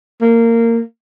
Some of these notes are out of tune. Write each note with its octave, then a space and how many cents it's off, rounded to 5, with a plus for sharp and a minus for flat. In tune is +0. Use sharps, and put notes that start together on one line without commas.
A#3 -20